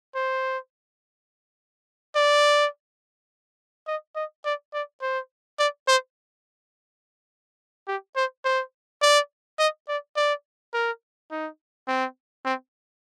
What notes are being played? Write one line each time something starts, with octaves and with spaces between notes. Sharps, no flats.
C5
D5
D#5
D#5
D5
D5
C5
D5
C5
G4
C5
C5
D5
D#5
D5
D5
A#4
D#4
C4
C4